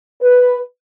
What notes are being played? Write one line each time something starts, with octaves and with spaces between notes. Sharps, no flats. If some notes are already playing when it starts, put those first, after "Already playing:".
B4